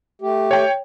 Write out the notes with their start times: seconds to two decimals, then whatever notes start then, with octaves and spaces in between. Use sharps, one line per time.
0.21 A3 G4
0.51 C#5 G5